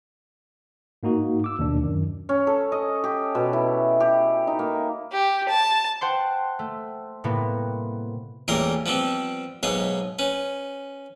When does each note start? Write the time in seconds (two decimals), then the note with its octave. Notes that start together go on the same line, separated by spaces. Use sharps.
1.03 G#2 A#3 D#4 F#4
1.44 D6 E6
1.59 D#2 B2 D4
1.83 F#2 D#3
2.29 C#4
2.47 A4
2.72 D#5
3.04 G4
3.35 B2
3.53 E4
4.00 G4
4.47 D#4
4.59 A#3
5.13 G4
5.49 A5
6.01 C5 F#5 G5 A5 C6
6.59 A3
7.24 A2 C3 G3 A#3 B3
8.48 A1 E2 A#2 G3 A#4 C6
8.86 F3 G3 B3 C4
9.63 B1 G#2 B3 C#5 C6
10.19 C#4 B4